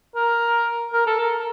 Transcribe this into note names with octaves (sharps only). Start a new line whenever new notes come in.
A#4
A#4
A4
A#4